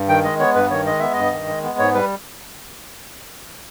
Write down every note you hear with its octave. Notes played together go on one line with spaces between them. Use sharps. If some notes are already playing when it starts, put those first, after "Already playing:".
Already playing: G2
D#3 G5
G#3 D#5
B3 C#5
G2 B4
D#3 C#5
G#3 D#5
B3 E5
G2 D#5
D#3
G#3
B3
G#2 C#5
G3 B4